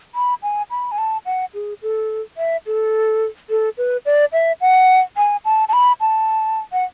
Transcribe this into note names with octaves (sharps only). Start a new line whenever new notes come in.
B5
G#5
B5
G#5
A5
F#5
G#4
A4
E5
A4
A4
B4
D5
E5
F#5
G#5
A5
A5
B5
A5
F#5